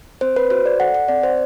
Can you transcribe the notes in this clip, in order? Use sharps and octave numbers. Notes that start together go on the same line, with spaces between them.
C4 C5
B4
F#4 C5
D5
A4 F#5
F#5
C4 D5
C5